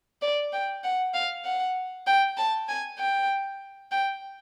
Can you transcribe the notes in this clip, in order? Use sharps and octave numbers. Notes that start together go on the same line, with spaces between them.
D5
G5
F#5
F5
F#5
G5
A5
G#5
G5
G5